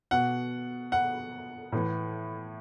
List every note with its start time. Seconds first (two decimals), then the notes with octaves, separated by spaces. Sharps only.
0.11 B2 F#5
0.92 F#5
1.72 A2 E3